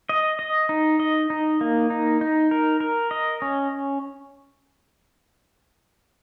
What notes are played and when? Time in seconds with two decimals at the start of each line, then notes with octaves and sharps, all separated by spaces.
0.09 D#5
0.39 D#5
0.69 D#4
1.00 D#5
1.30 D#4
1.61 A#3
1.90 D#4
2.21 D#4
2.51 A#4
2.80 A#4
3.11 D#5
3.42 C#4